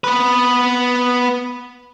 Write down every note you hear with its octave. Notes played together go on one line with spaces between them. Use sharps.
B3 B4